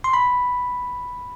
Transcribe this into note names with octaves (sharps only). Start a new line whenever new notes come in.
C6
B5